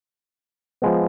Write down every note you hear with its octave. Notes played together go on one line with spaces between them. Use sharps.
F3 G#3 B3